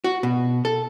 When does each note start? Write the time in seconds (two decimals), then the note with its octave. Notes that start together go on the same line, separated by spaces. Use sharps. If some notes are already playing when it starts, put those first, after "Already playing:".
0.04 F#4
0.23 B2
0.65 A4